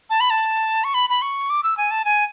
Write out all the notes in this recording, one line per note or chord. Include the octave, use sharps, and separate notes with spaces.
A5
B5
A5
C#6
B5
B5
C#6
D6
E6
G#5
A5
G#5